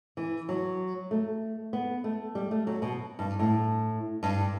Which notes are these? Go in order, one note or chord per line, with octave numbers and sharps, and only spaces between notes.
E3
F#3
A3
B3
A3
G3
A3
F#3
B2
G2
A2
G2